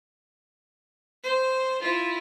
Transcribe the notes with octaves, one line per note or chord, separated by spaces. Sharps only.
C5
E4 F4